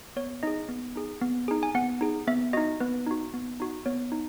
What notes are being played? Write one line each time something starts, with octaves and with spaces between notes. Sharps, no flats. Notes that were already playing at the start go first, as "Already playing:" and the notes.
B3 C#5
D#4 G#4 D#5
B3
D#4 G#4
B3
D#4 G#4
G#5
B3 F#5
D#4 G#4
B3 E5
D#4 F#4 D#5
B3 B4
D#4 F#4
B3
D#4 F#4
B3 C#5
D#4